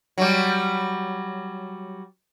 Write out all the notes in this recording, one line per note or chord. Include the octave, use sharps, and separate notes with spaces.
F#3 G3